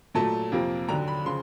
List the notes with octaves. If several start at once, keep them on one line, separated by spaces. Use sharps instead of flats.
A#2 F#3 A3 A5
F2 C3 F3 A#3
D#2 D3 F#3 A#5
B5
C#3 F3 C6